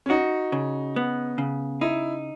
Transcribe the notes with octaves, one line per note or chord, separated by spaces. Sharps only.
C#4
D#4 F#4
C#3
B3
C#3
D#4 E4